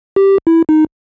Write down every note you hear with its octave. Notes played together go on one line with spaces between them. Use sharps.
G4
E4
D#4